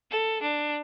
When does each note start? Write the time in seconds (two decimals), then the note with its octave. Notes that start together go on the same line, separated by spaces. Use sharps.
0.11 A4
0.42 D4